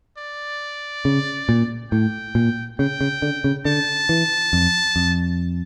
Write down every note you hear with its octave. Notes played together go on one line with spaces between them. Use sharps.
D5
C#3
A#2
A2 G5
A#2
C#3 G5
C#3
D3
C#3
D3 A5
E3
F2
F2